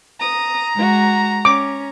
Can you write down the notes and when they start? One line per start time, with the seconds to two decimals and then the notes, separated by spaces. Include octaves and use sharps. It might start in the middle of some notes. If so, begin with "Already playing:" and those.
0.20 A#5 D#6
0.74 G#3 F#4
1.45 C#4 D6